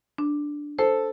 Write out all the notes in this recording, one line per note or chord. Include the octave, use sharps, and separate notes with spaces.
D4
A4 C5